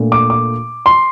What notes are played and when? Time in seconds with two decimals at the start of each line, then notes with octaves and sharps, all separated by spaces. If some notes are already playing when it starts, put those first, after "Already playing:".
Already playing: A#2 A3 D4
0.12 D6
0.30 D6
0.86 C6